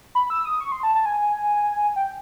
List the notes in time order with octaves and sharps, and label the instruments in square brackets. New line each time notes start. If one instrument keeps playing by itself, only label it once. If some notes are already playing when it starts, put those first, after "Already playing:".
[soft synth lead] B5
E6
D#6
C#6
C6
A5
A5
G#5
G5